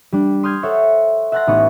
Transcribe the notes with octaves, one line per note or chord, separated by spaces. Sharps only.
G3 D4
C6 D#6 F6 G6 G#6 D#7
A4 C5 C#5 E5 F#5
E5 F#5 A5 C6 F#6 A#6
A1 B3 D#4 C#6